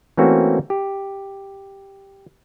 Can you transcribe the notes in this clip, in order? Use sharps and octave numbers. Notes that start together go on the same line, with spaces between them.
E3 A3 A#3 C4 C#4 F#4
G4